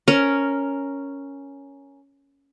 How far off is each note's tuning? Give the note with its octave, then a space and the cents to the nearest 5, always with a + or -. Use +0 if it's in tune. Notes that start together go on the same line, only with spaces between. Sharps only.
C#4 +5 A#4 +0